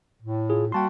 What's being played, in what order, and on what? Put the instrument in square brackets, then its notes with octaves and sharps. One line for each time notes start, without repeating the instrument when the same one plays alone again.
[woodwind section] A2
[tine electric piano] F4 G#4
[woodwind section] G3 A#3 F#4 [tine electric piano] G5 A5 C6